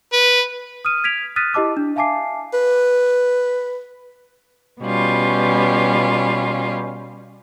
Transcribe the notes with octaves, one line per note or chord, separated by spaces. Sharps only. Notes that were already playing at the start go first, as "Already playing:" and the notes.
B4
D#6 F6 D#7
G#6 B6 D7 F7
D#6 F6 F#6 A6 B6 D#7
E4 G4 D#5 A5 D6 E6
D4
E5 F5 G#5 A5 D6 C7
B4
B2 G3 C#4 F4